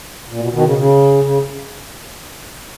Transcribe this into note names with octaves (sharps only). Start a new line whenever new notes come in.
A#2
B2
B2 D#3
C#3
C#3
C#3